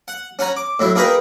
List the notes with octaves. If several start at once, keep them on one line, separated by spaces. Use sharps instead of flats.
F#5
C#4 F#5 G#5 A#5
D6
A2 F#3 E4
A#3 D#4 G#4 A#4 B4 G5